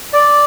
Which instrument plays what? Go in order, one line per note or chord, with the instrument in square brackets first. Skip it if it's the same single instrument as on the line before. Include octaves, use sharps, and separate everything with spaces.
[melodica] D5